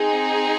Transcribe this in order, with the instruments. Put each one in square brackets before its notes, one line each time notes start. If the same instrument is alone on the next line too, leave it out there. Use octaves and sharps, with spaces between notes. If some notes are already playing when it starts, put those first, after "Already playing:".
Already playing: [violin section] C4 D#4 G#4